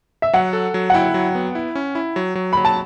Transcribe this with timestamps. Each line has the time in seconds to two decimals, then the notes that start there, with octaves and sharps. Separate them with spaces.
0.22 E5
0.33 F#3 F#5
0.53 A4
0.74 F#3
0.90 F#5
0.94 E4 G5
1.14 F#3
1.35 B3
1.55 E4
1.75 C#4
1.95 E4
2.16 F#3
2.35 F#3
2.53 F#3 B5
2.65 A5